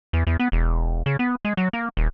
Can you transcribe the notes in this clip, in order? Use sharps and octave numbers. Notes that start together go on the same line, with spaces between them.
E2
E2
B3
E1
C#3
B3
G#3
F#3
A#3
D#1